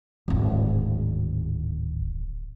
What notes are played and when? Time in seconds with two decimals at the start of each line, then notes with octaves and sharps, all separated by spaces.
0.28 D1 G#1